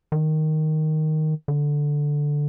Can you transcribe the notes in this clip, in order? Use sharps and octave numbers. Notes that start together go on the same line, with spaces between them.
D#3
D3